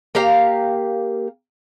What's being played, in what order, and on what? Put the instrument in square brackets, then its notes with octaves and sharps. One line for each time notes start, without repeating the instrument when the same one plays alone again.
[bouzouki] A#3 G4 F5 A#5